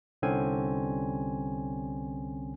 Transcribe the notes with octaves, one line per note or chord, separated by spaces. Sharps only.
C2 D3 C4 C#4 G#5